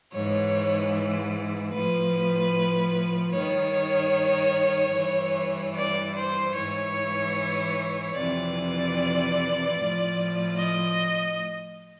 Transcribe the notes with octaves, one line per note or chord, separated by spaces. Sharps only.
G#2 E3 C#5
A2 F3 B4
G2 D#3 C#5
G2 E3
D5
C5
G#2 E3 C#5
F2 C3 E3 D5
A2 F3
D#5